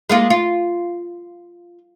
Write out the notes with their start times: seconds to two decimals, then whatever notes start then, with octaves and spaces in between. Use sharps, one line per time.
0.10 G#3 A#3 F4
0.30 F4